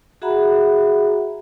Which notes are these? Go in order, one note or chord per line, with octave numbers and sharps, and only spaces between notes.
F#4 G#4 E5 F#5 A#5 B5